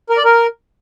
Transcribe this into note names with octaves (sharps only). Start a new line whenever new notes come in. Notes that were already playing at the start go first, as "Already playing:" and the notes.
A#4
D5
A#4